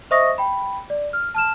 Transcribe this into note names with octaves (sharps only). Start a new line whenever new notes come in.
C5 D#5 E5 C#6 D#6 A#6
G5 B5
D5
F6
A5 F6 E7